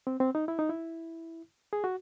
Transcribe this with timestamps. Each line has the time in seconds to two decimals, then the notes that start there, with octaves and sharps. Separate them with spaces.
0.07 C4
0.20 C4
0.35 D#4
0.48 E4
0.59 D#4
0.69 E4
1.73 G#4
1.84 F#4